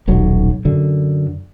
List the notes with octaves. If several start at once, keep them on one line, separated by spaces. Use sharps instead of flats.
D#1 B1 F#3
F#2 D3